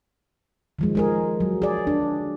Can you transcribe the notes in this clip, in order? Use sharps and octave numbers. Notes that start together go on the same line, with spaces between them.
D#3 F3 G#3
G#3 G#4 A#4
F#3
G#4 D5
D4